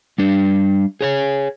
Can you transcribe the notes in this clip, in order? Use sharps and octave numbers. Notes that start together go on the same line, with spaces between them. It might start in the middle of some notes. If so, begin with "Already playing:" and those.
G3 D4
G#4 C#5 G#5